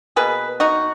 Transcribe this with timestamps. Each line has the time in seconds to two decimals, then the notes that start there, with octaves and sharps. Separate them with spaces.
0.16 B2 A#3 G#4 B4
0.60 D#4 F#4